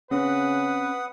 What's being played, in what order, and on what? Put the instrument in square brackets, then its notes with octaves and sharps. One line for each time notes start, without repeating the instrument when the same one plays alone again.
[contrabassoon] C#3 [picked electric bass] C4 C#4 [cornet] B4 [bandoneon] F#5 D#6